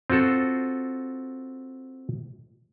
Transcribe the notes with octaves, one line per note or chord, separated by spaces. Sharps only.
C4 F4 F#4 A4